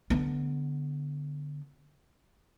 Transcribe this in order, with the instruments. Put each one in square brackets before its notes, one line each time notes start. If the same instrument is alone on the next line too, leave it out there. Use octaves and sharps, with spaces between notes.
[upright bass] D3 B3